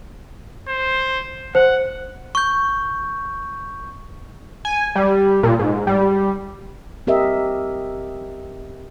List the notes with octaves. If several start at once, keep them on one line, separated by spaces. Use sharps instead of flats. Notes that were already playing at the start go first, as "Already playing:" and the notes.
C5
C5 F#5
C#6 G6
G#5
G3
A#2
G#2
G3
C4 G4 A#4 D#5 E5